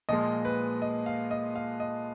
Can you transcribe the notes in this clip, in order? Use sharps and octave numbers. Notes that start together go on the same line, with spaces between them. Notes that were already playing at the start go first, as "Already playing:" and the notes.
A#2 F3 G#3 D#5
B4
D#5
F5
D#5
F5
D#5